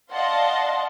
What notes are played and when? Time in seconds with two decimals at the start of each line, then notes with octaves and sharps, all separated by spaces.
0.11 D5 D#5 F5 F#5 A5 C6